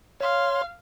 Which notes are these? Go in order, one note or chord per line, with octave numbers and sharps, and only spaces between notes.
C#5 F5 C6